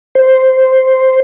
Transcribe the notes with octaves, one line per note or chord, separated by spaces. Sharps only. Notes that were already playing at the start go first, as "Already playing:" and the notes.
C5